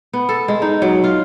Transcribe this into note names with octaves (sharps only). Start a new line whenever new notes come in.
B3
A4
G#3
D#4
F#3
F4